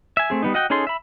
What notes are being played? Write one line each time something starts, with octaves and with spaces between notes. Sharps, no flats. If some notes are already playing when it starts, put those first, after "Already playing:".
E5 G#5
A3 C4 G#4
G3 B3 D#4
F#4 D#5 F#5 G5
C#4 D#4 G#4 A4 C6
E5 B5